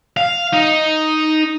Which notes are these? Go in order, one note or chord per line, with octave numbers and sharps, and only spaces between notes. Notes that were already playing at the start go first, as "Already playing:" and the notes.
F5
D#4